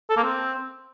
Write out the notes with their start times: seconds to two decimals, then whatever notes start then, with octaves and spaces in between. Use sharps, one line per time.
0.10 A4
0.17 A#3
0.24 C4